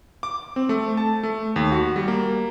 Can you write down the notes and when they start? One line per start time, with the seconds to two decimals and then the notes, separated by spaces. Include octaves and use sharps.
0.23 D6
0.56 C4
0.69 A3
0.97 A5
1.23 A3
1.56 D#2
1.72 F#4
1.96 G3
2.08 A#3